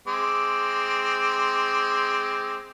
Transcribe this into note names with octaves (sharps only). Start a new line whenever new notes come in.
G#3 C4 D6